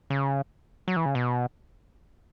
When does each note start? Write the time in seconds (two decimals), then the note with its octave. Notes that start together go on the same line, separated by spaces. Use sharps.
0.10 C#3
0.88 F#3
0.96 E3
1.06 C#3
1.15 B2